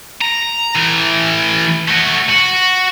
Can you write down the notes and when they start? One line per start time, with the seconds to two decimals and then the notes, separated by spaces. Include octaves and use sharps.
0.22 A#5
0.76 E3 A3
1.88 A3 F#4
2.30 F#4